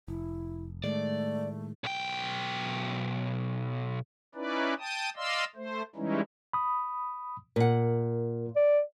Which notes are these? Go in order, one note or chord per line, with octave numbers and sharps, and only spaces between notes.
F1 E4
A2 D#3 G#3 A3 D5
B1 G5
C#4 D#4 E4 B4 D5
G5 A5 D#6
D5 D#5 F5 C6 E6
A3 C5
E3 G3 G#3 C#4 D#4 E4
B5 D#6
A#2 A#4 F#5
D5